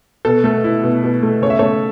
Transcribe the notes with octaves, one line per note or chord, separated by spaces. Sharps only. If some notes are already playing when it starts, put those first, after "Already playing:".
B2 A4
A3 A4
E4
B2
B2
A3
C#3 C#5
E5
A3 A4 C#5